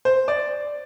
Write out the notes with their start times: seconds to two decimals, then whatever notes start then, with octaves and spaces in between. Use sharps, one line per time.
0.05 C5
0.28 D5